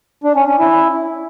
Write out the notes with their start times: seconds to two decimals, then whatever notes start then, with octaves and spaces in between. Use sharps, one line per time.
0.24 D4
0.36 C#4
0.47 C#4
0.59 E4